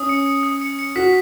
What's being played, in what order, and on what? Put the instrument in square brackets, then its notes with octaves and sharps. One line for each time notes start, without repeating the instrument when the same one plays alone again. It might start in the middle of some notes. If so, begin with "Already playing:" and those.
Already playing: [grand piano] C#4 [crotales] D#6
[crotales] C#7
C#7
D#6
C#7
C#7
[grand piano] F#4 [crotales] B6